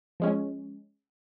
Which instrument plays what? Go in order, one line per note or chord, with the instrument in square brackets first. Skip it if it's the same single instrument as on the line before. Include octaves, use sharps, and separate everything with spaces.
[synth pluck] F3 G#3 C#4